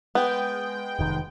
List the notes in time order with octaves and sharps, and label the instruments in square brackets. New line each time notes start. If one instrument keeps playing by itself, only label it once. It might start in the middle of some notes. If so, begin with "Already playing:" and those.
[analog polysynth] G#3 G5 [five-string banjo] B3
[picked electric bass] F1 D#3